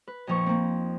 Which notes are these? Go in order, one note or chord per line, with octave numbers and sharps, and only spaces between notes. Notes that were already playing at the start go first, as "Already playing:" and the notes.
B4
F2 A#2 F3 D#4 C#6
A#3 C4